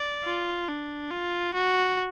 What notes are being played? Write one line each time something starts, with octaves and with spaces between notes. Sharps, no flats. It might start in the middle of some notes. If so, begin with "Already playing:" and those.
Already playing: D5
F4
D4
F4
F#4